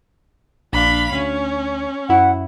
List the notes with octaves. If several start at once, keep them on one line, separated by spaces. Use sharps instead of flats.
A#1 D4 F5 B5
D2 C#4
F#2 E4 F#5